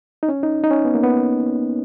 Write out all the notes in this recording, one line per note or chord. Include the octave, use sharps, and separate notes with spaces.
D#4
C#4
D#4
D#4
C#4
B3
A#3
B3